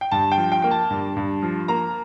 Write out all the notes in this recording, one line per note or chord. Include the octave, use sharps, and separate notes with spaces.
G5
G2 A5
G5
F3
G5
A#3 G5
A5
G2
G2
F3
A#3 A#5